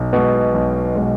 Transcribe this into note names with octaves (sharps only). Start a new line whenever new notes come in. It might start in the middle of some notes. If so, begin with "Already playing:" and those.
Already playing: B1
B2 G#3
B1
B2 G#3